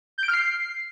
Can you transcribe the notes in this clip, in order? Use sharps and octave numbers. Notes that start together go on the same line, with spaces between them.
G6
D7
F6
C7